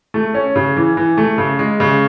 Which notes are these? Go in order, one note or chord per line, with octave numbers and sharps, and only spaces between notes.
A3
C#4
C#3
E3
E3
A3
C#3
G#3
C#3